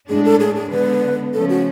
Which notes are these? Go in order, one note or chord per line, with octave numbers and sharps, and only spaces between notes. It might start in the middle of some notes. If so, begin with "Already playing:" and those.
A2 G#3 D4 G#4
A4
G#4
G#4
D3 G#3 B3 B4
C#3 F3 A3 C#4 A4
F#4